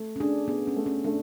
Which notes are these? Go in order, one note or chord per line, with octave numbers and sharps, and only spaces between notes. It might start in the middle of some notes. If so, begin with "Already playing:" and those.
Already playing: A3
C#4
D4 G#4
B3 G#4
C#4
A3
C#4
A3 D4